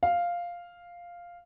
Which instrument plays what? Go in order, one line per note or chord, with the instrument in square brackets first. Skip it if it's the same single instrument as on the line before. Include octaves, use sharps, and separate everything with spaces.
[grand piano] F5